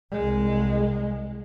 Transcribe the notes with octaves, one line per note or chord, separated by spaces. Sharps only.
C2 G#3